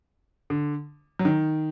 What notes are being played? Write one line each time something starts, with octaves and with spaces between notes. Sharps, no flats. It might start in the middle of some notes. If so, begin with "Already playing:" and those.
D3
F#3
D#3